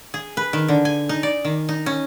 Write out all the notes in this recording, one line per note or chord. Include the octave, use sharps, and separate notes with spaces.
G#4
B4
D#3
D3
G#5
D#4
D5
D#3
D#4
C#4